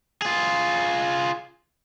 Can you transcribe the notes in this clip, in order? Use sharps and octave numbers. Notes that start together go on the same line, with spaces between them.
F4 G#4